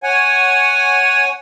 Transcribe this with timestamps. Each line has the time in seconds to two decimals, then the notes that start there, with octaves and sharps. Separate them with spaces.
0.03 C#5 F#5 G#5